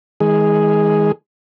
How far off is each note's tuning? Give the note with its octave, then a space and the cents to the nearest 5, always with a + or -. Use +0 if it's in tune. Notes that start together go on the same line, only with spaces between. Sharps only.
D#3 +40 G#3 +0 G#4 +0